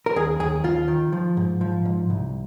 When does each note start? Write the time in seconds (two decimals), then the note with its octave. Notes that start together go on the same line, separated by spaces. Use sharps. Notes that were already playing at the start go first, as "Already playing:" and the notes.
0.06 A#4
0.16 D#2 G#4
0.40 D#2 G#4
0.64 D#2 F4
0.88 D#3
1.12 F3
1.37 G#2
1.61 F3
1.85 G#2
2.10 C2